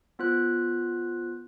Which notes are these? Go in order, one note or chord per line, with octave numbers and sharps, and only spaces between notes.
B3 F4 C5 F#6